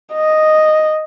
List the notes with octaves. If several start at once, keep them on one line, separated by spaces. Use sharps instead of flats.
D#5